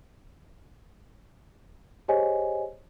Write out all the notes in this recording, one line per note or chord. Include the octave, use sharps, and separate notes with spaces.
G4 G#4 C5 C#5 D#5 G#5